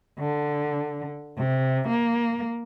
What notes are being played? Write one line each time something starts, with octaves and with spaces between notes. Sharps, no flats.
D3
C3
A#3